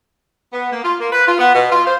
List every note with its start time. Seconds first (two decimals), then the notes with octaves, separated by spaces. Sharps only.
0.53 B3
0.71 A#3
0.84 F4
1.00 A#3
1.12 B4
1.26 F4
1.38 B3
1.54 B2
1.71 F4
1.86 C5